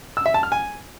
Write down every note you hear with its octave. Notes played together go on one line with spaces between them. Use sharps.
E6
E5
A5
F6
G#5